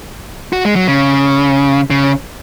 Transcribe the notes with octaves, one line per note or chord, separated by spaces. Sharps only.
F#4
G#3
F#3
C#3
C#3